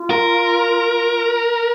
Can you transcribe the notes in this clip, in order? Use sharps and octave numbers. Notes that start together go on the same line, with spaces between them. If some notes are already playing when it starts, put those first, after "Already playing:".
Already playing: F4
A#4